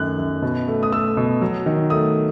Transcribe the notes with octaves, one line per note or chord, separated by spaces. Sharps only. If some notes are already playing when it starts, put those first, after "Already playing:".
Already playing: F#2 D#3 A3 F#6
F#2
B2
A3
D#6
A3 E6
B2
F#3
D#3
A3 D#6